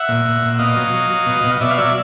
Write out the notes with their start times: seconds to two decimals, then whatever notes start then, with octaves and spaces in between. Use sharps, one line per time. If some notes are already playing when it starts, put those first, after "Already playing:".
Already playing: E5 F#5
0.09 A#2
0.25 A#2
0.42 A#2
0.59 B2 D#5 F5
0.76 F#3
0.93 F#3
1.10 F#3
1.26 B2
1.44 B2
1.61 B2 D5 E5
1.71 F5
1.77 F#3 D5 E5